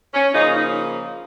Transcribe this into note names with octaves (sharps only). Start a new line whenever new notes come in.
C#4
C#3 F3 A#3 D#4
D#4